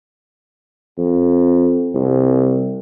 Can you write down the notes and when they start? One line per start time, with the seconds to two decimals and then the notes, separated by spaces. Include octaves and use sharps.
0.98 F2
1.94 C2